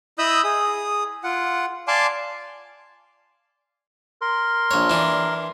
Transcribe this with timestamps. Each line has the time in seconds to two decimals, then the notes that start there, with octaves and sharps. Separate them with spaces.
0.19 E4 D#5 B5 D#6 E6 G6
0.44 G#4 D#6
1.24 F4 F#5
1.88 D5 F5 G#5 A5 C6 D6
4.22 A#4 C6
4.71 A#1 C#5
4.90 E3 D4